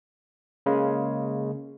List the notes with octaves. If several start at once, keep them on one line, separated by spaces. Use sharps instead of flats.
C#3 G#3 A#3